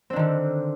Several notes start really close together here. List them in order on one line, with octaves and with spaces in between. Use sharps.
C4 D4 D#3 D3